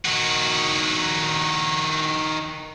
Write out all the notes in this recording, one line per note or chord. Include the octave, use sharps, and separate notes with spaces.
D#3 F#4